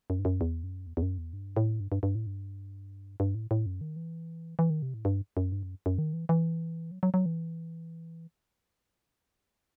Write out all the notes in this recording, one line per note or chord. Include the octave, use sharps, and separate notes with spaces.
F#2
G2
F#2
E2
F#2
E2
E2
F#2
E2
G2
A2
G2
G2
G2
A2
G2
G2
A2
A2
F#2
D#3
E3
E3
D#3
C3
A2
G2
F#2
G2
F#2
F#2
D#3
E3
E3
F#3
F#3
F#3
E3